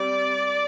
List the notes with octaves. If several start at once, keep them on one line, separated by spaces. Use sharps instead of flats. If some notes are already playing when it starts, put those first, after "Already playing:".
Already playing: G3 C4 D5